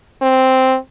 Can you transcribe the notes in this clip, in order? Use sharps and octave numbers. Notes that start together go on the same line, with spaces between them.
C4